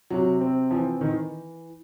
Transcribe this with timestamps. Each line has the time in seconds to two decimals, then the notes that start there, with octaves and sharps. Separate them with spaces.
0.10 C3 F#3
0.41 C4
0.71 E3 F3
1.01 D#3 E3